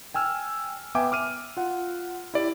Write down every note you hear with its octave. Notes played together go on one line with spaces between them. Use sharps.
G5 G#5 E6 F6
B3 E5 G5 G#5 D6
D6 F6 D#7
F4 F#5
E4 G4 D5